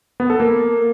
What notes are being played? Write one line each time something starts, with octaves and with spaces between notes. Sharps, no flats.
B3
A4
A#3